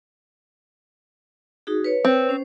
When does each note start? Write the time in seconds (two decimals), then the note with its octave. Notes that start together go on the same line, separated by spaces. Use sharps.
1.67 D#4 F#4 G#4
1.84 B4 C#5
2.05 C4
2.29 C#4 C5